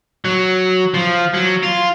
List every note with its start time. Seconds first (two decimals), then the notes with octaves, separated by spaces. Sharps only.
0.25 F#3
0.94 F3
1.34 F#3
1.63 F4